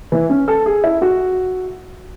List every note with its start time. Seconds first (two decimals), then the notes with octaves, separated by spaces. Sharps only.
0.12 E3
0.30 C#4
0.48 A4
0.66 G#4
0.84 E4
1.02 F#4